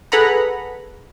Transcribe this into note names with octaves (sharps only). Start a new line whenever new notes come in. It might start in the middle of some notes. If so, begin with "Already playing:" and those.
G#4 A4 B4 F#5 A#5 B5